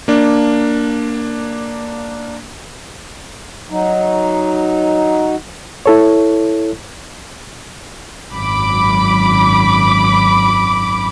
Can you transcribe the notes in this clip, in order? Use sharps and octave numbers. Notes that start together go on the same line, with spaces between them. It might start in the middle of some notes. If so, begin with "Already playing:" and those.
A#3 D4
F#3 D#4
E4 A4 C#5
G#1 F#2 B5 D6